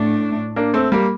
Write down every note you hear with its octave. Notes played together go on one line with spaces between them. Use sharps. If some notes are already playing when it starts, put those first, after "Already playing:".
Already playing: A2 A3 D4
A#3 D4
A3 C4
G3 A#3